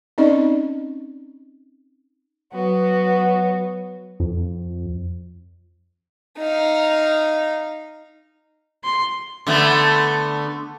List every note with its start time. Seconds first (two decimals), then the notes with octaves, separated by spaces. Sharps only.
0.18 C4 C#4 D#4 D5 D#5
2.53 F#3 B3 F#4
4.20 F2
6.39 D#4 F5
8.84 C6
9.47 D3 A3 B3